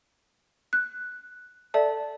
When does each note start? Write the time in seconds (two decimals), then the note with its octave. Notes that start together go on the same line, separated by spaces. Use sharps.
0.73 F#6
1.74 A4 D5 E5 A5